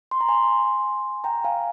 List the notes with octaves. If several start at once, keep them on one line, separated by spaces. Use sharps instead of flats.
C6
A#5
G#5 C6
G5 A#5
F5 G#5